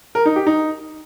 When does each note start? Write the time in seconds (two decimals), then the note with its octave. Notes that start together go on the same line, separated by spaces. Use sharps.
0.15 A#4
0.25 D#4
0.36 G4
0.46 D#4